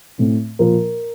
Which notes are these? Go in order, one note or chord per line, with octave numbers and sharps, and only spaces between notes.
A2 A3 C4
A#2 F3 A#3 A#4